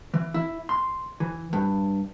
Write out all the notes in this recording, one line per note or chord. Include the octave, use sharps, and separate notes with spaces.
E3
E4
C6
E3
G2